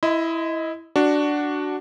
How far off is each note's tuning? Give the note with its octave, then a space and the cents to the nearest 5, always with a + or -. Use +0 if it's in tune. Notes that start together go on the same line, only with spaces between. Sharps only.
E4 +0 D#5 +25 C6 -35
D4 +0 F#4 +10